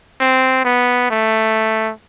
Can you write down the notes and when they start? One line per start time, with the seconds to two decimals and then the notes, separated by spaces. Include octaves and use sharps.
0.20 C4
0.65 B3
1.10 A3